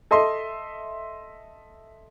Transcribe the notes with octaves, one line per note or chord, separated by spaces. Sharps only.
A4 D#5 E5 C6